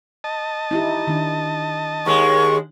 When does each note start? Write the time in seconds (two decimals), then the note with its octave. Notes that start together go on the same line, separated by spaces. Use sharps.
0.24 D#5 A5
0.71 D#4 E4 G4
1.07 D#3 D4
2.06 D#2 G#3 C#6